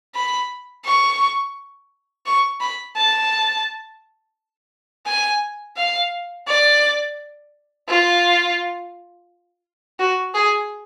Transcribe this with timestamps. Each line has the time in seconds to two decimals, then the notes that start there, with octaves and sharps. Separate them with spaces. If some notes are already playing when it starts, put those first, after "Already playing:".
0.15 B5
0.85 C#6
2.26 C#6
2.60 B5
2.96 A5
5.06 G#5
5.76 F5
6.47 D5
7.89 F4
10.00 F#4
10.34 G#4